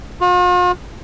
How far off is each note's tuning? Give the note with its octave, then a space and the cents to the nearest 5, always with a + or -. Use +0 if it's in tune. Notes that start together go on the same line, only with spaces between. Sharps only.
F4 +45